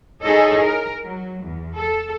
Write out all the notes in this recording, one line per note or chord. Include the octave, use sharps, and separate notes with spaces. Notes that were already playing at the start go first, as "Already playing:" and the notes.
D#4 E4 G#4 A4 C#5 D#5
A#4
F#3
E2
A4